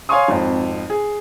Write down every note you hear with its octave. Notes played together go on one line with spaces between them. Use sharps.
C#5 F5 G#5 C6 C#6 D#6
G#1 F2
G#4